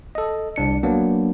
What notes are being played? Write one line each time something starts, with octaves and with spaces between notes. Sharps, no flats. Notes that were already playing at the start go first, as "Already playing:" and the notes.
A4 D#5
C2 D4 C#7
F#3 A#3 B3 D4